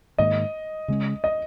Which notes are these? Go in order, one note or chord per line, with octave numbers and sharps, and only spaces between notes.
G#2 D#3 A#3 D#5
C#3 G#3 C#4
D#5